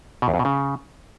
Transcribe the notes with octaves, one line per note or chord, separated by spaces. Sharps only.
B2
E2
F2
B2
C#3